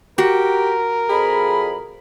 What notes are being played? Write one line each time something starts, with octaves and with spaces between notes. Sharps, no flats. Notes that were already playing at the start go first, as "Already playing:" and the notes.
F#4 G4 A#4
F2 G#4 B5